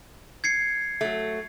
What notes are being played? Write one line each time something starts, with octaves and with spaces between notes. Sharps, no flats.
G#6 C7 C#7
F#3 A3